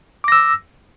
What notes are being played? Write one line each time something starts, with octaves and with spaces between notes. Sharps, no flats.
D6 E6 A#6